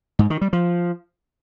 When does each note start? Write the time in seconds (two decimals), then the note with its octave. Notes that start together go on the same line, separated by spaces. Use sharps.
0.19 G#2
0.30 D#3
0.41 G3
0.53 F3